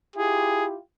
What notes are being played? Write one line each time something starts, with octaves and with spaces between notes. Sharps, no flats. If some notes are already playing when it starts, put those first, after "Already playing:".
E4 F4 G4 G#4